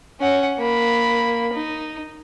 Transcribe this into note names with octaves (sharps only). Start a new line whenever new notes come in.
C#4 F#5
A#3 B5
D#4